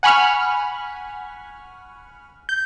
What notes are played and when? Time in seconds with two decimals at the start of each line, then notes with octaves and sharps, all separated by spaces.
0.03 F#5 G#5 B5 C#6 F6
2.49 G6